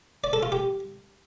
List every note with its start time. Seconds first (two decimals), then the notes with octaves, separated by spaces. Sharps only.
0.24 D5
0.33 A4
0.43 F4
0.52 G4